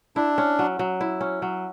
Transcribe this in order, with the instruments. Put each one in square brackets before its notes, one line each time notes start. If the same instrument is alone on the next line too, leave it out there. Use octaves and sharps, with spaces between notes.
[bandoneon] D4 [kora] E4
[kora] C#4
F#3
F#3
E4
C#4
F#3